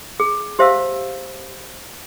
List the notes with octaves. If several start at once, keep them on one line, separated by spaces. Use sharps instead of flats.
G#4
G4 C5 E5 F5 A5 E6